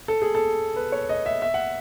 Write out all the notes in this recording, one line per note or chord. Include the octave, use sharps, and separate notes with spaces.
A4
G#4
A4
B4
C#5
D#5
E5
E5
F#5